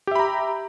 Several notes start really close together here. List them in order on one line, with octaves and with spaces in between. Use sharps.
G4 E5 B5 A#5